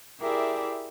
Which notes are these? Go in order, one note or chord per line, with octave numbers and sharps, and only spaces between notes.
E4 G4 G#4 A#4 D5 E5